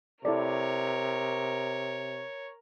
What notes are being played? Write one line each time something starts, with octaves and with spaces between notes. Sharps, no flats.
C3 E4 A4 A#4 C#5 D5